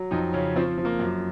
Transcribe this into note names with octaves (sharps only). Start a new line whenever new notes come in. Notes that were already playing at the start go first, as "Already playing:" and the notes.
Already playing: F#3
F2 D#4
C#3 C#4
F3 C4
F3
A#3
F#2